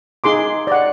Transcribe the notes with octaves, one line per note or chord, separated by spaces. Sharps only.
D#4 G#4 C6 D6
D5 F#5